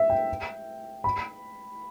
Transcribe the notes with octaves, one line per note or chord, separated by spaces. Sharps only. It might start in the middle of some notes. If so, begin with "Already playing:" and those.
Already playing: E5
G5
B5